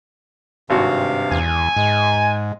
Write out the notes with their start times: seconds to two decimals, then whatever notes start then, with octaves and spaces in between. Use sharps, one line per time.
0.70 G#1 G2 C3 F#4 F5
1.31 E2 G#5
1.76 G#2 G#3